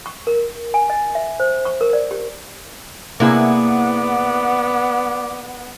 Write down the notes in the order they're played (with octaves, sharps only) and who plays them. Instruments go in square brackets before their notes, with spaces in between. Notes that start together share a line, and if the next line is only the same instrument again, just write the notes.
[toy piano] C#6
A#4
G#5
D#5
E5
C5
C#6
A#4
D5
G4
[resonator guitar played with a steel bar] C3 E4 G#4 [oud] A#3 [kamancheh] B3 F#5 [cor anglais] D5